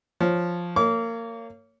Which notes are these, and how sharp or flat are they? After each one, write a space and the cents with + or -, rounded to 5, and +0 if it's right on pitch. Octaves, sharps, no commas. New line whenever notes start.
F3 +0 C#5 +0
A#3 -25 C#5 +10 D6 -35